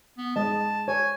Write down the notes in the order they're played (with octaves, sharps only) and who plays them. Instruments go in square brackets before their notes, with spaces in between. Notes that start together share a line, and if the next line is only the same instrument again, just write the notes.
[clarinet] B3
[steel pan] G#3 D#5 [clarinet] A5
[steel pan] C#5 [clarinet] G#5